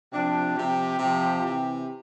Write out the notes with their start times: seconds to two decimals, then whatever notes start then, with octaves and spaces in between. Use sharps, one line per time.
0.11 C3 F3 D4
0.55 C3 F3 G4
0.99 C3 F3
1.42 C3 E3